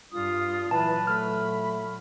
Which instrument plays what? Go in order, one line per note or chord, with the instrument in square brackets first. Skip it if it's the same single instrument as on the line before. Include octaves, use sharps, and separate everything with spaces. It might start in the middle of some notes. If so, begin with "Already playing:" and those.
[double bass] G2 [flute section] F4 D#6
[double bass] A#2 F#3 [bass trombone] E3 [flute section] B4 [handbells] A5
[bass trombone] A3 [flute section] B5 [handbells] F6